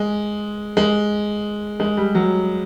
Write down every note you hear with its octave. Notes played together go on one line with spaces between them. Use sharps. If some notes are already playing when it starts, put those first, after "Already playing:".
Already playing: G#3
G#3
G#3
G3
F#3